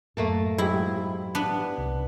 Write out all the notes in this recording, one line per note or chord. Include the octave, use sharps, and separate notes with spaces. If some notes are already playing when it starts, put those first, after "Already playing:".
F#2 A2 A3 A#3 A4
G#2 F#3 E4 G4
B3 D4 B5
C2